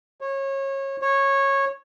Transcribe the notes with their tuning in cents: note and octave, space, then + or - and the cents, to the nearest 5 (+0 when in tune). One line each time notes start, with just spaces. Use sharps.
C#5 -25
C#5 -15